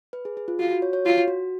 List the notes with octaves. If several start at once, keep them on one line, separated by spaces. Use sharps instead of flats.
B4
G#4
G#4
F4
F4 F#4
F#4
C#5
C#5
F4 F#4
F#4